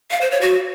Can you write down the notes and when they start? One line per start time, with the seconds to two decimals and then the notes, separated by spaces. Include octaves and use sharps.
0.11 F5
0.21 C5
0.31 C#5
0.41 F#4